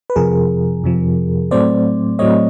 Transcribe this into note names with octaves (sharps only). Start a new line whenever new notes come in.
B4
F2 C3 F3 G#4 A#4
F2 C3 F3
A2 F#3 A3 C4 C5 D5
A2 F#3 A3 C4 C#5 D#5